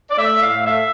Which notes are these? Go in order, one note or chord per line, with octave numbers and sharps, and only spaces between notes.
D5
A3 E5
A2 F5
A3 E5